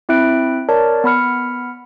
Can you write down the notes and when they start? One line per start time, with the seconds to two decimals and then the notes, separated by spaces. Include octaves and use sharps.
0.09 C4 E4 E5 F#6 D7
0.69 A#4 C#5 D5 A5
1.04 B3 B5 F6 C#7